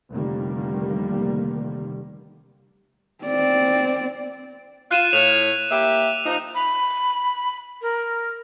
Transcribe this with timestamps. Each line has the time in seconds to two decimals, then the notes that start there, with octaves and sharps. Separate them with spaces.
0.11 F1 D3 D#3 G3 A#3
3.25 C4 D5
4.91 F4 F#6 D#7 E7
5.13 A2 C#5 F7
5.71 A#3 G4 E5
6.26 F3 D#4
6.55 B5
7.82 A#4